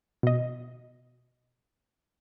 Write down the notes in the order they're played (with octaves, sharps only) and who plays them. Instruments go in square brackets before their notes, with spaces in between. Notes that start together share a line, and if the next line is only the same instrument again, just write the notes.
[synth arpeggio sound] B2 D#5